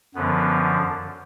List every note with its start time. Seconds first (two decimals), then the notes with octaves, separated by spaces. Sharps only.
0.14 F#2 D3 F3 B3